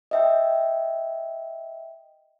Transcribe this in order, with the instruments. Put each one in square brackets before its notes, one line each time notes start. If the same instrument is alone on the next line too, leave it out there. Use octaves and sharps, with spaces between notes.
[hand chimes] D#5 E5 G5